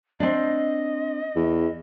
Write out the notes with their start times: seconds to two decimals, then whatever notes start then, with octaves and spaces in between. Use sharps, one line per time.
0.20 C4 D4 D#5
1.35 E2